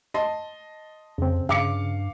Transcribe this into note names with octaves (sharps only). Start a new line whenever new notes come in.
D#5 A5 C6
F2 C#3 C4
G2 C#3 F5 D6 C#7